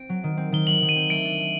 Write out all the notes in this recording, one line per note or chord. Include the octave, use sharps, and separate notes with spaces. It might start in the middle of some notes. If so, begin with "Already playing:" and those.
Already playing: C4 D7
F#3
D#3
C4
D#3 G7
F#3 F#7
D#3
D#7
C4
A3 D7
D4
A3